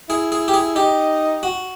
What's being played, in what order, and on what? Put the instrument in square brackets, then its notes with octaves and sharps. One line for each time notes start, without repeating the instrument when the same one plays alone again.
[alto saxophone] E4 [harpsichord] G#4
[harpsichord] G#4
G4
G#4
[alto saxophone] D#4 [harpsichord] G4
[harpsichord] F#4